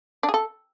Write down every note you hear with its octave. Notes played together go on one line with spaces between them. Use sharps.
D4
G#4
A4